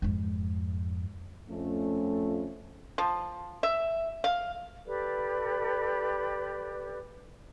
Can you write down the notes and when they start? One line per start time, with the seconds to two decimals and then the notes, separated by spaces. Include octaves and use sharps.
0.02 F2 G#2
1.49 F2 A3 C#4
2.98 F3
3.63 E5
4.24 F5
4.86 G4 A4 B4 D5